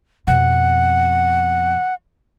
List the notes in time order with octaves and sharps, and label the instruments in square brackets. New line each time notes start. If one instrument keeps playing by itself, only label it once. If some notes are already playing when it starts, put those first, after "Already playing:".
[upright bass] F2 B2 [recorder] F#5